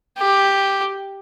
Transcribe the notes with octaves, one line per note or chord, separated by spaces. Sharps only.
G4